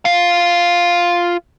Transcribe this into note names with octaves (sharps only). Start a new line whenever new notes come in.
F4 F5